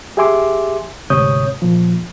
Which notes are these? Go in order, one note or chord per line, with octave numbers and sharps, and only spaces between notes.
G4 G#4 E5 G#5 C6 D6
D2 G#2 C3 C#5 D#6 G6
A#2 F3